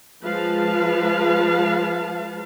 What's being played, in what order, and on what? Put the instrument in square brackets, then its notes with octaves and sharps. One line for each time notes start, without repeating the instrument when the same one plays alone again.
[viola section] F3 G#3 B4 F5 A5